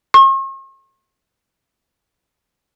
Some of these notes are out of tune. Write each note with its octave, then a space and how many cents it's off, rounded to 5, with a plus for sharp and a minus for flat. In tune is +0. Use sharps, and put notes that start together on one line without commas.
C#6 -45